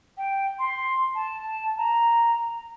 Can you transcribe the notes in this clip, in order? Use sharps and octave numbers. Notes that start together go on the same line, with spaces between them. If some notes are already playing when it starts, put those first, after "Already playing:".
G5
C6
A5
A#5